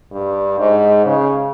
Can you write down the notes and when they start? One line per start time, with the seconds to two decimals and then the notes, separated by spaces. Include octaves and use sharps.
0.12 G2
0.59 G#2
1.05 C#3